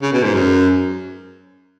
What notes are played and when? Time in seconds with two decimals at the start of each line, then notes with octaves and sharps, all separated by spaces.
0.02 C#3
0.13 B2
0.23 G#2
0.34 F#2